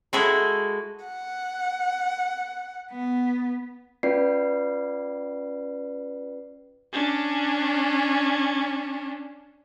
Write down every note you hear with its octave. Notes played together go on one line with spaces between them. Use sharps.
G#3 E4 F#4 G#4 A4
F#5
B3
C#4 F4 B4 D5 C7
C#4 D4